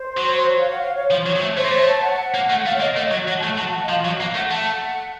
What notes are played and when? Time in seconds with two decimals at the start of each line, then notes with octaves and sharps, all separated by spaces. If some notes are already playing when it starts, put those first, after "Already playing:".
Already playing: C5
0.17 F#3
0.49 C#5
0.59 F5
0.69 F#5
0.79 F5
0.95 C#5
1.11 F3 C5
1.26 F#3 C#5
1.36 F#3
1.41 A3
1.57 A3 C5
1.64 A#3
1.71 A3 C#5
1.88 A5
2.03 F#5
2.34 A#3
2.50 A3
2.65 A3 F5
2.74 C#5
2.80 A#3 D#5
2.96 A3 D#5
3.11 F#3 C#5
3.27 F#3 F#5
3.37 A5
3.42 A3 F#5
3.58 F#3 A5
3.69 F5
3.74 F#5
3.84 D#5
3.89 F3 F5
4.05 F#3
4.13 F#5
4.20 A#3 F5
4.35 A3 F#5
4.50 A3 A5
4.66 F#5